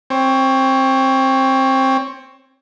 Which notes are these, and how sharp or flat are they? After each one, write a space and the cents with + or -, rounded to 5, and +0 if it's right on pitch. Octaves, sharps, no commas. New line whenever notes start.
C4 +15 C#5 +5